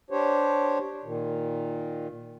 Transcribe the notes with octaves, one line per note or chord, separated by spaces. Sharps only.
D4 G4 C5 C#5
A#2 D#3